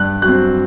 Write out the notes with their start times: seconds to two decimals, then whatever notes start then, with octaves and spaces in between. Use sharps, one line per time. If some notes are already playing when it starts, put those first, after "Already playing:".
Already playing: G2 F#6
0.22 F#3 F#6
0.28 C4